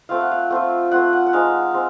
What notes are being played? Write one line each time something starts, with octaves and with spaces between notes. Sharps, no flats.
A3 C4 F4 F5
F#5
F5
A3 C4 F4
A3 C4 F4 F#5
F#5
F#5
G#3 C4 D#4 F5
G#3 C4